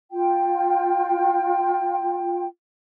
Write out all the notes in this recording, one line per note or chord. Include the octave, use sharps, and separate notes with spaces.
F4 G5